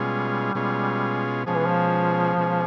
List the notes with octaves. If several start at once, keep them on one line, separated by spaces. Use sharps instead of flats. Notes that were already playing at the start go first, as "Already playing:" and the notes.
Already playing: B2 G3 G#3 C#4 F4 G#4
B2 G#3 C#4 F4 G#4
B2 F3 G#3 C#4 F4 G#4
E3
F3
B2 G#3 C#4 F4 G#4